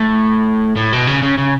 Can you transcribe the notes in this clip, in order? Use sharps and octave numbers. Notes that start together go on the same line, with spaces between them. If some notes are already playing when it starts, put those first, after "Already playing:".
Already playing: A2
A2
B2
C#3
C#3
C#3